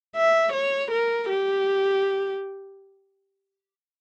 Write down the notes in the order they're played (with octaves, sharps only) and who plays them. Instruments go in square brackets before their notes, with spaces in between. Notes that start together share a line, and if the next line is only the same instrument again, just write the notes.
[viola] E5
C#5
A#4
G4